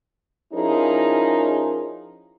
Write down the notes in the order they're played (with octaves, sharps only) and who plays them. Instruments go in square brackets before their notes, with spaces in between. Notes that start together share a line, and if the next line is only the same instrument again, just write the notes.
[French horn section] F3 C#4 D#4 E4 G#4 A#4